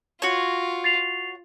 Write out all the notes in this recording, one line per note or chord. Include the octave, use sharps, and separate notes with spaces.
F4 F#4 C#5
A6 C7 F7